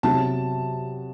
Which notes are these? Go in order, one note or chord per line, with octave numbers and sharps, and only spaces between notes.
C3 F#3 B3 A5